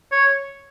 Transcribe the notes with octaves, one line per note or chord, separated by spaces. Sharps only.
C#5